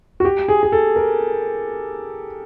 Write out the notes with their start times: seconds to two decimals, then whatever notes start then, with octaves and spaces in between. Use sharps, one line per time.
0.20 F#4
0.25 G4
0.48 G#4
0.63 G#4
0.72 A4
0.96 A#4